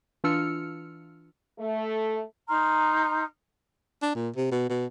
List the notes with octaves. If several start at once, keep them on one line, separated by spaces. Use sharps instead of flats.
E3 D4 F4 E6 F6 C#7
A3
D#4 A#5 C6 F6
D4
A#2
C3
B2
B2